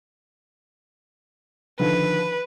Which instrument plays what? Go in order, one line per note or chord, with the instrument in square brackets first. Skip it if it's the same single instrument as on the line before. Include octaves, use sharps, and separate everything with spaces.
[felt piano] D3 D#3 F3 [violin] B4